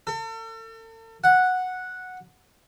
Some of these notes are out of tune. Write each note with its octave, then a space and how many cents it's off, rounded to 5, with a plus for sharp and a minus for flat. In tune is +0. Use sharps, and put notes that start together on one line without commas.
A4 +40
F#5 -5